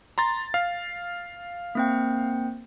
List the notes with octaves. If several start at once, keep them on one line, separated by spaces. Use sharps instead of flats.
A#5 C6 A6
F5
A#3 C4 G5